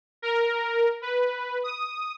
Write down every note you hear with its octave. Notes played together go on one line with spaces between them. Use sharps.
A#4
B4
D#6